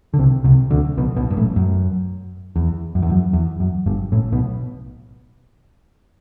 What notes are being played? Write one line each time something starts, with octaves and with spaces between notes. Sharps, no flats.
D3
C2 C3
C2 C3
D2 D3
B1 B2
B1 B2
G2
A1 A2
F#2
E2
F#2
E2
F#2
E2
F#2
G1 G2
A1 A2
B1 B2